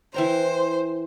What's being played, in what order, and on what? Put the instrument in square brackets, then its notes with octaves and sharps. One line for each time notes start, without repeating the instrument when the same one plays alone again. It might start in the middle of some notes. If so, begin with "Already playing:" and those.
[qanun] E3 G5 A#5 [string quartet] C5